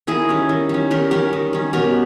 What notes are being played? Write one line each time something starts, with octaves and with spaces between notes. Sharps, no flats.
D#3 E4 G#4
G3 C#4
D#3
G3 C#4
D#3 G4 A#4
G3 C#4 G4 A#4
D#3
G3 C#4
B2 G4 A#4